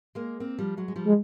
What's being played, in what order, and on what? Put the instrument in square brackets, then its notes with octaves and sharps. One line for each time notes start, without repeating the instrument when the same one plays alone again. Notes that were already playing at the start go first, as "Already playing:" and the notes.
[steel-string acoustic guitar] G#3 A#3
A#3 C4
F3 G3
F#3 G#3
G#3
F3 G3
[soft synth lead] G#3